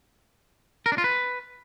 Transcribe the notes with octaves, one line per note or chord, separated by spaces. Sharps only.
A#4
D4
F4
B4